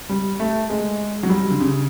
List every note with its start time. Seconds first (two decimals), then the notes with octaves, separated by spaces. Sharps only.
0.09 G3
0.40 A3
0.70 G#3
1.23 F#3
1.29 G3
1.51 D3
1.60 C#3